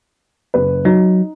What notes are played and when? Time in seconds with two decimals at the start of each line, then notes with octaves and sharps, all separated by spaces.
0.54 F#1 B4
0.85 F#3 D#4